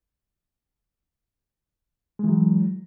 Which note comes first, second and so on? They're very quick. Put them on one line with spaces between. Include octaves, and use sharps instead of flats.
G#3 E3 F#3